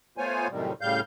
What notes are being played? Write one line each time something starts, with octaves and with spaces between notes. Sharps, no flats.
A3 B3 F4 C5 C#5 G#5
F#2 A2 C3 D#3 G3
A2 C#3 G3 F5 G6